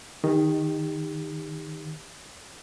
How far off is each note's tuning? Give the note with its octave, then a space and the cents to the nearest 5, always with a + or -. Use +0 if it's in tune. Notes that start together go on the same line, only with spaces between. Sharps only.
D#3 +0 G4 +35